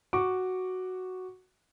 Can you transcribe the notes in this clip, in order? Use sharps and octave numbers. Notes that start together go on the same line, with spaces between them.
F#4 C#6 D6